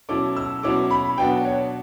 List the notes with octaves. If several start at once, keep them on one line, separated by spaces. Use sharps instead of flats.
B2 F#3 C#4 E4 A4 D6
E6
B2 F#3 C#4 E4 A4 D6
B5
B2 F#3 B3 D4 F#4 G5
C#5